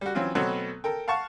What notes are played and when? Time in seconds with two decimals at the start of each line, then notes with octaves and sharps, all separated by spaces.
0.01 G3 F#4
0.15 E3 F#3 C4 C#4 F4
0.35 B2 F#3 A3 B3 C4
0.84 A4 A#4 G5
1.08 F5 F#5 A5 C#6